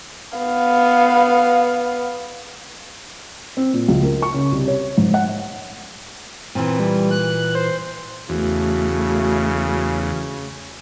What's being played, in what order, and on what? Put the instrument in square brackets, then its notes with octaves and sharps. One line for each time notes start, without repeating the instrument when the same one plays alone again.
[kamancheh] B3 F5
[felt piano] C4
A#2
C#2
A#4
C#6
C#3
C2
C#5
G#2
F#5
[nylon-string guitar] A#2 E3 [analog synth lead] C4
[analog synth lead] G3
F#6
C5
[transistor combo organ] E2 [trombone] C#3 [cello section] A3 [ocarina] F#4